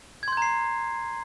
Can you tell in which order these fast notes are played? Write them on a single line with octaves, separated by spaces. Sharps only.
G#6 C6 G6 A#5 C7